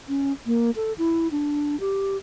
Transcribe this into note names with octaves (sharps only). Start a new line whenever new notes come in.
C#4
A#3
A4
E4
D4
G4